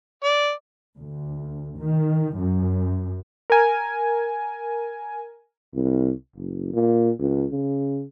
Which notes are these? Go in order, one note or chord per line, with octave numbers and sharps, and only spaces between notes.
D5
D2
D#3
F#2
A#4 G#5
C2
F#1
A#2
C#2
C#3